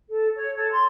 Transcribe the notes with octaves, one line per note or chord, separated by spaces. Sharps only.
A4
C#5
A4
C6